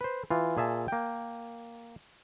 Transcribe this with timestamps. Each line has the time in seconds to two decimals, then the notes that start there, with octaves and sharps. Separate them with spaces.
0.01 B4 C5
0.30 E3 F4
0.57 A#2 G#4 E5 A5
0.88 A#3 G5